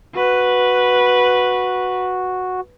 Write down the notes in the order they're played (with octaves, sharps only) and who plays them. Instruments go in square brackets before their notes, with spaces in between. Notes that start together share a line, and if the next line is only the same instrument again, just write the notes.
[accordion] F#4 [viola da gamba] B4